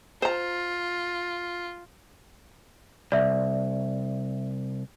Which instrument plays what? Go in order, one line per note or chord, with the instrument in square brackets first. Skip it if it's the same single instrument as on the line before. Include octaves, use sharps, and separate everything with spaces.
[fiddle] F4 [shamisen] C5 A#5
[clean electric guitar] C2 [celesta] D5 E5